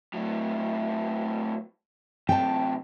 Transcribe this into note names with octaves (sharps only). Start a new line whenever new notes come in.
A2 F#3
F#2 C3 G5 A5